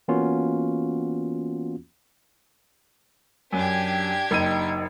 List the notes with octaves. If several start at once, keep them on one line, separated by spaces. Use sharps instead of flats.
E3 A#3 B3 C#4 F4 F#4
F#2 D4 G4 G#6
F#1 D#4 D#7